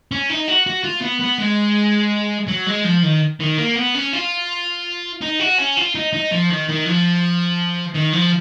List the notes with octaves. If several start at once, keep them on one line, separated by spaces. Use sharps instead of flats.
C#4
D#4
F#4
F#4
F4
B3
B3
G#3
F#3
G#3
F3
D#3
D#3
A#3
B3
C#4
F4
D#4
F#4
C#4
F4
D#4
D#4
F3
D#3
D#3
F3
D#3
F3